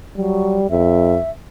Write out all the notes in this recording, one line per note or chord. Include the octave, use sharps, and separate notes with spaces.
F#3 G3
F2 E5